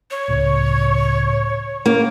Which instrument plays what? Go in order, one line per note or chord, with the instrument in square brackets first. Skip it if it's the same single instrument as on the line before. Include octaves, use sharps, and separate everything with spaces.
[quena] C#5
[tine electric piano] C#2 A2 C#3
[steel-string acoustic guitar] A#3 [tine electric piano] C#4 E4